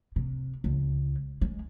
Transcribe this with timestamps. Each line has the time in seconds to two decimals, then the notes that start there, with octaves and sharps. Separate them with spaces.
0.16 C3
0.64 C#2
1.41 G#3